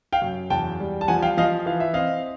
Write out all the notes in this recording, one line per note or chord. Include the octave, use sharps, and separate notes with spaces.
F5 G5
F#2
E2 G5 A5
G3
A5
F3 F#5 G#5
F5 G5
F3 D#5 F5
E3 F5
E5
C4 D#5 F5